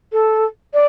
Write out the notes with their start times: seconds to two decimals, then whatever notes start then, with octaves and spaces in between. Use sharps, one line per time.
0.12 A4
0.73 D5